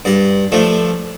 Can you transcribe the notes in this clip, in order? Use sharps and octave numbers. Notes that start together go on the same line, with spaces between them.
G2 D5
F3 A3 D4